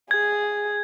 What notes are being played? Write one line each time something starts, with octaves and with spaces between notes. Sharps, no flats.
G#4 G#6